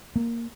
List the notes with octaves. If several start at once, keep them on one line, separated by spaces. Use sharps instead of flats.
A#3